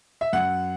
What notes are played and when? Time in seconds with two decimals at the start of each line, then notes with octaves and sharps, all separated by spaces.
0.21 E5
0.33 F#2 F#5